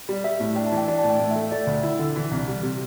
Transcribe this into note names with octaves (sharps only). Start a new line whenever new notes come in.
G3 D5
G3 E5
A2
D4 G5
A5
E3
G5
D4 D5
A2 A5
G5
A2
E5
A3
E5
A3 D5
D2
E4
D3
E3
C2
G3
C3